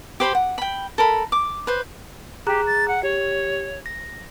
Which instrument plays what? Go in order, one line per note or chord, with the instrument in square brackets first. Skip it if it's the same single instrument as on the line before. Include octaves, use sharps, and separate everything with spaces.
[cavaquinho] G4 C5 B5 C6
F#5
G5 B5
A4 A#4 B5
D6
B4 C5
[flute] G4 [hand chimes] G#4 A#5 F#6
[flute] A6
F#5
[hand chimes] G4 [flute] C#5
[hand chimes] A#6